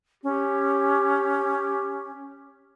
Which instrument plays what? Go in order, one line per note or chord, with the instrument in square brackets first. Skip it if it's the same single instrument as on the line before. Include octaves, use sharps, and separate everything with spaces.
[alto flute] C#4 [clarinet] G4